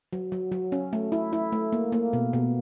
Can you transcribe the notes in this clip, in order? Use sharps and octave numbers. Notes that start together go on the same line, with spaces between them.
F#3
F#3
F#3
C#4
A3
E4
E4
A3
A#3
A#3
B2
B2